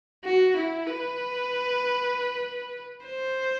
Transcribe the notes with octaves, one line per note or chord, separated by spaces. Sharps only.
F#4
E4
B4
C5